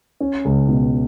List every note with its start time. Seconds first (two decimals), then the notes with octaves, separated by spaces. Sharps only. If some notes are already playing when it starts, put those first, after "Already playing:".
0.20 C#4
0.45 C#2
0.68 B2